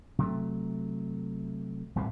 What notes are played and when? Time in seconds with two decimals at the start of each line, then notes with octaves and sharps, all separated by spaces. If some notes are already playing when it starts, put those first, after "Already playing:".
0.18 C3 F#3 A3
1.96 D#1 C2 A2 C3